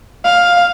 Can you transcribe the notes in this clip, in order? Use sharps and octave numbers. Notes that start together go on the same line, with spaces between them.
F5